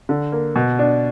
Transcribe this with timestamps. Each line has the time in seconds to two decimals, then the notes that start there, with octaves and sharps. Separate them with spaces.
0.09 D3
0.32 A#3
0.56 B2
0.79 D4